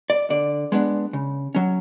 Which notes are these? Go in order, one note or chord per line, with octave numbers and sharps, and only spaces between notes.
D5
D3 D5
G#3 B3 D4
C#3
F#3 C#4